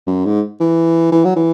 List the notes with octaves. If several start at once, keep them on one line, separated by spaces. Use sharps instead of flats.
F#2
G#2
E3
E3
F#3
E3